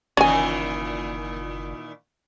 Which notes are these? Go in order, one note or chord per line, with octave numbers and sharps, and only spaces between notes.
F#1 A#2 D#3 E3 C#4 G#5